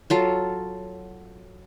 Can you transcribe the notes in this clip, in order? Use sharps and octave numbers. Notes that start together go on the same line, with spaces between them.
F#3 F4 A4